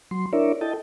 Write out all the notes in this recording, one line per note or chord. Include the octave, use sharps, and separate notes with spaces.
F#3 C6
D4 E4 A#4 C#5 D5 E5
E4 A4 D#5 G5 A5